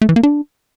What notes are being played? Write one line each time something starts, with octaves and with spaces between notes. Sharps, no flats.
A3
E3
A#3
D4